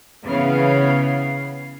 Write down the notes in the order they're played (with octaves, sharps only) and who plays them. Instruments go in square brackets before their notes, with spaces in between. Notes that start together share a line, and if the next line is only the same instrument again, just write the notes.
[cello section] C#3 E3 B3 C#5 F5